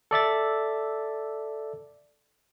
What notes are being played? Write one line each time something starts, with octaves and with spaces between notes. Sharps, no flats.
A4 D5 E5 A6